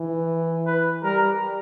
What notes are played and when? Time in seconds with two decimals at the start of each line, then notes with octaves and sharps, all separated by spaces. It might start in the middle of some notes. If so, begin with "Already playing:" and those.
Already playing: E3
0.66 B4
1.04 G3 A#4